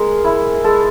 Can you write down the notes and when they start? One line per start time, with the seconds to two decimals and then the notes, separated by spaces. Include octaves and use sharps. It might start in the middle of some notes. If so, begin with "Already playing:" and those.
Already playing: G#3 A#4
0.24 E4
0.64 G#3 A4